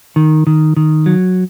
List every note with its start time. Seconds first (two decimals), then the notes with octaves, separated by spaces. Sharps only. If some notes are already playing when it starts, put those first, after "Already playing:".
0.16 D#3
0.47 D#3
0.77 D#3
1.06 F#3